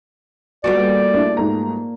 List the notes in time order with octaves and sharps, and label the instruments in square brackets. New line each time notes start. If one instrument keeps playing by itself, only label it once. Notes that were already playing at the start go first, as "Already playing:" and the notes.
[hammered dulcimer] A#2 A4 [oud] G3 B3 F#4 [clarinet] D5
[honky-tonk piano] A3 D4 E4
[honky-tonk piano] G#2 A3 A#5 [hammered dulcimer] A#3